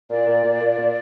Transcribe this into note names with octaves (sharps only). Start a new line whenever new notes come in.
A#2 D5
A#2
A#2
A#2
A#2